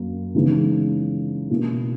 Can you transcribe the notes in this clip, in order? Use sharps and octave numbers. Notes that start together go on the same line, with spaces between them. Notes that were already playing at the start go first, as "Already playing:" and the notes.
Already playing: F#2 A#3
C#3 E3 G#3 B3 D#4
B2 A#3 E4